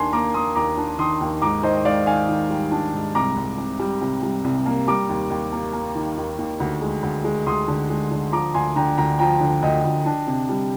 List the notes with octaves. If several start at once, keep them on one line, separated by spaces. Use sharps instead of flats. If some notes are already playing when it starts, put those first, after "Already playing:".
Already playing: D#2 D4 G#5 C6
A#3 A#5 D6
A#3 C6 D#6
D#2 A#5 D6
D4
D#3 C6 D#6
D#2
G#2 A#5 D6
D#3 C5 D#5
D#5
G#2 D5 F5
D#3 F5 G#5
D#3
G3
D4
G#2
C2 A#5 D6
C2
C3
G3
C3
G3
C2
A#3
G3 A#5 D6
D#2
D#2
A#3
A#3
D#3
D#2
D#2
D2
G#3
D2
G#3
D2 C6 D#6
D3
G#3
D3
F3 A#5 D6
D2 G#5 C6
D3 G5 A#5
D2 G5 A#5
F3 G5 A#5
D3
D2 D#5 G5
D2
D4
C3
G3